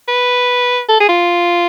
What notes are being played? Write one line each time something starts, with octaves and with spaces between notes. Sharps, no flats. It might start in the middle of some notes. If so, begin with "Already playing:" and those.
B4
A4
G#4
F4